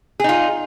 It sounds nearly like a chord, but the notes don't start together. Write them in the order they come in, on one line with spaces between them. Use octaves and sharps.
G#4 D#4 F4